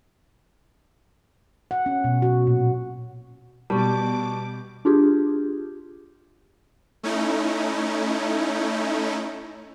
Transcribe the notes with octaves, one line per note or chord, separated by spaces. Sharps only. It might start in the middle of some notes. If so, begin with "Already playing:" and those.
F#5
C#4
B2
F#4
A#2
B2 G3 A5 C#6 D6
D4 F4 G4 G#4
A3 C#4 D#4 E4